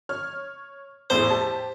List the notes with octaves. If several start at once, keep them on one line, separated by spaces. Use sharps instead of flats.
C#5 F6
E2 A2 G#4 C5
G4 A5